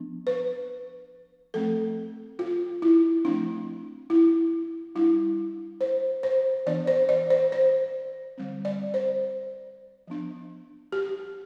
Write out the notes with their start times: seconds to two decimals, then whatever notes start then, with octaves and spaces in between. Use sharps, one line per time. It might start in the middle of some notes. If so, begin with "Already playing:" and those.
Already playing: F3 B3 D4
0.27 B4
1.54 F3 A3 C4 A4
2.39 F4
2.82 E4
3.25 F3 A3 C4 D4
4.10 E4
4.95 G3 D4 E4
5.81 C5
6.23 C5
6.66 E3 B3 D4 D5
6.87 C5
7.09 D5
7.30 C5
7.52 C5
8.38 D3 G3 C4
8.65 D5
8.94 C5
10.07 F3 B3 D4
10.92 G4